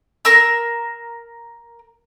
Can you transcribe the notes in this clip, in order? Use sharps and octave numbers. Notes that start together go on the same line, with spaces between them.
A#4 A#5 E6